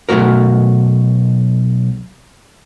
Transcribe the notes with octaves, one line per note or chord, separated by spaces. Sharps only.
B1 G#2 A3 F#4 A#4